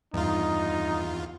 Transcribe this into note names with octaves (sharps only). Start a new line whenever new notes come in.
E2 G2 D#4 F4